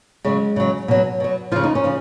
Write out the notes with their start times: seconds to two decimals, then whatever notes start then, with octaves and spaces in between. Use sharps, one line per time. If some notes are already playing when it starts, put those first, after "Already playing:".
0.25 C#3 F#3 G#3
0.56 C#3 F#3
0.88 B2 F#3
1.20 B2 F#3
1.52 C#3 F3 F4
1.64 D#4
1.75 C#4
1.84 C#3 F3